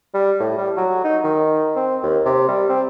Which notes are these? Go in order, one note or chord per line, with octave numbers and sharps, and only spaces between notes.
G3
A2
G3
F#3
D#4
D#3
C4
D#2
C3
G3
C4